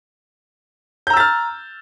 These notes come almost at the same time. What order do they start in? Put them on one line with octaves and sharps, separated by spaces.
G6 A#5 E6 A6 F6